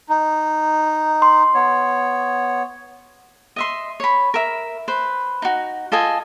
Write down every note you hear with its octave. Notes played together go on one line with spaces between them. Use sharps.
D#4
C6
B3 C#5
D#5 E5 C6
C#5 B5
A#4 E5
B4 C5
D#4 F#4
F4 A4 D#5 G#5